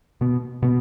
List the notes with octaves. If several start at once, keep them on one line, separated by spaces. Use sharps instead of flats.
B2 B3
B2 B3